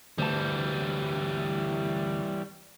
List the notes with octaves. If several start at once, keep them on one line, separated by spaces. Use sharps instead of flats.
D2 E3 G3 A5